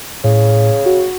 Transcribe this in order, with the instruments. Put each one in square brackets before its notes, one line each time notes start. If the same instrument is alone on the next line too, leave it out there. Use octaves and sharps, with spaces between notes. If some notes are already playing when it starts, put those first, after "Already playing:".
[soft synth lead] A2 [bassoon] C#3
[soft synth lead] F#4